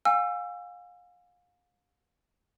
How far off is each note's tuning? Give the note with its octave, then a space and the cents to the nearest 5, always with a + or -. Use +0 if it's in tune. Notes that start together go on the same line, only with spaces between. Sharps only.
F5 +35 G#5 -35 E6 +25